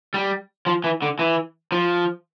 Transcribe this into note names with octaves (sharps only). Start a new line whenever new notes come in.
G3
F3
E3
D3
E3
F3